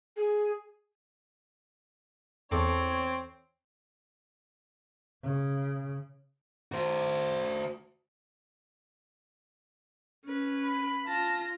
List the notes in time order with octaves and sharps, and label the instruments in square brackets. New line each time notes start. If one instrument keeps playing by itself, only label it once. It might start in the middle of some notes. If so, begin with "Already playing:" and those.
[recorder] G#4
[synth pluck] E2 A4 D6 [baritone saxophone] C4 [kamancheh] C#5
[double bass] C#3
[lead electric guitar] F#4 C5
[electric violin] C#4 B4
[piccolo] B5
[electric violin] F4 A#6 [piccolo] A5